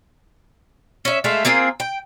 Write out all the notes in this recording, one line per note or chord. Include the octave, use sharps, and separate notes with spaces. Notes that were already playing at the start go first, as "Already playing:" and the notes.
C#4 E5
G#3 A3 E5 F5
A#3 C4 F4 G#4
G5